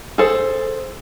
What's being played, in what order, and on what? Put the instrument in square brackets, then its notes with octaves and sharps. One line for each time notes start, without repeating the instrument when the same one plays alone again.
[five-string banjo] G#4 A4 C5